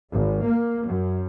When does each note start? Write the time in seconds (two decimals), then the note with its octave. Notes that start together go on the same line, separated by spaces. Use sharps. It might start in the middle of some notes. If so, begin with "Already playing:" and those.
0.11 G#1
0.44 A#3
0.85 F#2